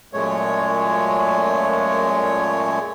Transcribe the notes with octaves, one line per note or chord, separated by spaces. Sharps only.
F#2 A#2 G#3 A3 C#5